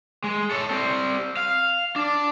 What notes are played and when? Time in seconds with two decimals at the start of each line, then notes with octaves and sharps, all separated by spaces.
0.24 G#3
0.51 A4 C#5
0.70 G3 C4
1.37 F5
1.96 D4